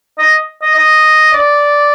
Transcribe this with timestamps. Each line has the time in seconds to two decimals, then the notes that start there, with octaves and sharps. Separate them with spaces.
0.19 D#5
0.62 D#5
0.76 D#5
1.33 D5